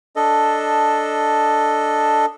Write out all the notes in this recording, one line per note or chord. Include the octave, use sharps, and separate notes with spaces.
D4 A4 D#5